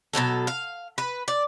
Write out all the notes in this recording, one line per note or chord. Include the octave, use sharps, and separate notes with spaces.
B2 E3 F#3 A4
F5
B4
D5